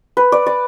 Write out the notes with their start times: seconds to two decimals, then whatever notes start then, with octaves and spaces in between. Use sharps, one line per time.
0.17 B4
0.32 D5
0.47 D5